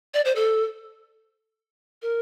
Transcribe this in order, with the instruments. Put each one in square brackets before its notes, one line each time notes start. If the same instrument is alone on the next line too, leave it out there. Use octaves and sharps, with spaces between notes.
[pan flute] D5
C5
A4
A#4